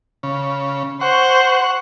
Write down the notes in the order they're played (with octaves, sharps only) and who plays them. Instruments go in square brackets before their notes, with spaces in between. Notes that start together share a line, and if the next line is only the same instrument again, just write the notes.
[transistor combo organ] C#3
[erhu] C5 [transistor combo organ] F#5 C#6